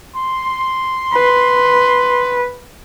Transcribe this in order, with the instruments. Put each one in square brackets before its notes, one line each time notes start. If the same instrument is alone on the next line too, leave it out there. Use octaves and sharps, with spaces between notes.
[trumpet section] C6
[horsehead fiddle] B4